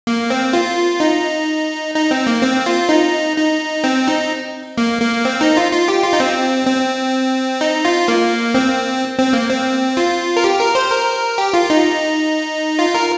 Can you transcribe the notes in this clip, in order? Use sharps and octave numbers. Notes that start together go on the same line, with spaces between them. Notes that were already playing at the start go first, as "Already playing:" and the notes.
A#3
C4
F4
D#4
D#4
C4
A#3
C4
F4
D#4
D#4
C4
D#4
A#3
A#3
C4
D#4
F4
F4
G4
F4
D#4
C4
C4
D#4
F4
A#3
C4
C4
A#3
C4
F4
A#4
G4
A#4
C5
A#4
G4
F4
D#4
F4
A#4